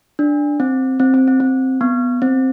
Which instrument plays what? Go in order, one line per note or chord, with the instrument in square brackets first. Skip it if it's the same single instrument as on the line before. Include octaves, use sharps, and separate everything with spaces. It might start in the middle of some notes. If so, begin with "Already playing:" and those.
[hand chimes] D4
C4
C4
C4
C4
C4
B3
C4